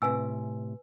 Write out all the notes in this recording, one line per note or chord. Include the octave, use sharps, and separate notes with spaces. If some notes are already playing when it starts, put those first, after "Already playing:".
A2 C3 B4 G#5 E6